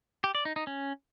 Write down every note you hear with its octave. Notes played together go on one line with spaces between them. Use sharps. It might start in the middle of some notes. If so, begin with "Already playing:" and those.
G4
D5
D#4
D#4
C#4